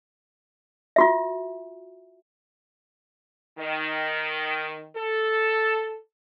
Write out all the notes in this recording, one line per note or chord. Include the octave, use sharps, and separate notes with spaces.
F4 F#4 E5
D#3
A4